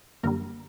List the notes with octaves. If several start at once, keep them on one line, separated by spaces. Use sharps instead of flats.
F#2 D3 G3 A#3 A#4